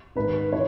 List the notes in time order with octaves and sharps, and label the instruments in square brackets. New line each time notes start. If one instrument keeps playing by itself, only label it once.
[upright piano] G#2 D#3 B4
E3 C#5